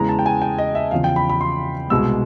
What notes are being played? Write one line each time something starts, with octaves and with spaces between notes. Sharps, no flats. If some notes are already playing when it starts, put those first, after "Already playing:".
Already playing: E2 C#3 E3 G#3 A#5
A5
G5
G#5
G5
D#5
E5
E2 C#3 F3 F5
G5
B5
B5
C6
C2 B2 G#3 E6